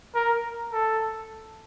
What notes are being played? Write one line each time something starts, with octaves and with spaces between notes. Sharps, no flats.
A#4
A4